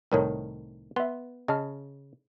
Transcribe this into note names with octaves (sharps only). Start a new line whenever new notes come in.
C2 A2 D#3 A4 A#4 C#5
B3 E5 C6
C#3 D#5 A5 F6